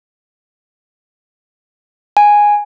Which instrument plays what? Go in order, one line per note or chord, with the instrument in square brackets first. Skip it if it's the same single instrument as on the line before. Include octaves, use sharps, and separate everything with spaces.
[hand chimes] G#5